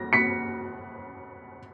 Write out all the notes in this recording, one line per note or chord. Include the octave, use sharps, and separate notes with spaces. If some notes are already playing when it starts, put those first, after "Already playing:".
Already playing: A#6
B6 C#7